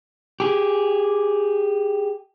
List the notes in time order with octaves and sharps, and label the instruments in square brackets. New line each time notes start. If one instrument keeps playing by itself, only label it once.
[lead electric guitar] G4 G#4